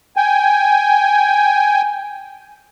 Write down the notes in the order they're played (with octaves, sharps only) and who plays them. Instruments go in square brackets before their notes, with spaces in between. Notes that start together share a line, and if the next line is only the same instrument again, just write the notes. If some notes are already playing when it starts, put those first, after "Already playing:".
[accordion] G5 G#5